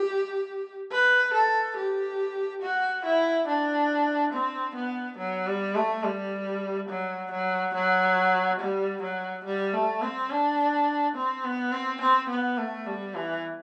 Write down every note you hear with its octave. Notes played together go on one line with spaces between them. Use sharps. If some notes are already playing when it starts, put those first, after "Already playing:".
Already playing: G4
B4
A4
G4
F#4
E4
D4
C4
B3
F#3
G3
A3
G3
F#3
F#3
F#3
G3
F#3
G3
A3
C4
D4
C4
B3
C4
C4
B3
A3
G3
E3